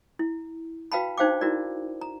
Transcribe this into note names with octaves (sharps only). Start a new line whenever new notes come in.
E4
F#4 B4 F5 G5 A5 B5
D4 D#4 C5 F5 G5 D6
E4 F#4 A#4 D5
A#5